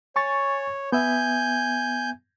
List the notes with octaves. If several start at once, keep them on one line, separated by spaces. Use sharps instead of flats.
C#5 G#5 C#6 A6
B3 E5 G#5 G6